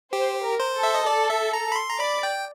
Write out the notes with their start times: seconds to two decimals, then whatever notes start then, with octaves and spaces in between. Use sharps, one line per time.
0.13 G4 C5
0.44 A#4
0.60 C5
0.76 A4
0.83 E5
0.95 D#5
1.06 A4 D5
1.30 E5
1.53 A#5
1.72 B5
1.76 C6
1.89 A#5
2.00 D5 B5
2.23 G5